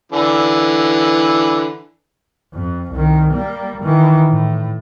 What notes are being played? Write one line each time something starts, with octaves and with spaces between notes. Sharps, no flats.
D3 E3
F2
C2 D#3
G3 A#3
D#3 E3
A2